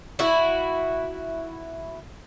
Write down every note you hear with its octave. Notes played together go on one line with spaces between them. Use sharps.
E4 F#4